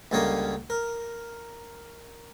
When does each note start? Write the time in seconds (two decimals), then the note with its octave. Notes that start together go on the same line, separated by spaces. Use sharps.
0.11 C#2 D3 G3 A#3 C#5 D#5
0.70 A#4